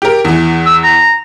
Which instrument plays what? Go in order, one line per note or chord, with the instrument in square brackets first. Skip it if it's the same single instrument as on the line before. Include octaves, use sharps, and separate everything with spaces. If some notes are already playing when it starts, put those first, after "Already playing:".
[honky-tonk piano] G4 A#4
E2 E3
[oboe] E6
A#5